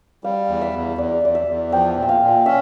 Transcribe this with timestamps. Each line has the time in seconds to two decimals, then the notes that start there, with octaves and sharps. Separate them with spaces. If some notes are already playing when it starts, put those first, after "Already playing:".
0.24 G3 F5
0.48 E2
0.61 E5
0.73 E2
0.98 E2 D5
1.23 E2 D5
1.35 E5
1.47 E2
1.72 F3 G5
1.96 A#2
2.02 E5
2.09 F5
2.22 A#2
2.46 C#4 E5